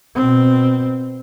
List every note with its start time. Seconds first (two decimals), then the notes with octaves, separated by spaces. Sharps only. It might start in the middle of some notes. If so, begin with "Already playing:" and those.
0.15 B2 C4